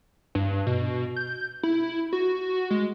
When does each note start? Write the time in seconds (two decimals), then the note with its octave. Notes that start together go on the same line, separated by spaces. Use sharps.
0.35 G2
0.66 B2
1.16 G6
1.63 E4
2.13 F#4
2.70 G#3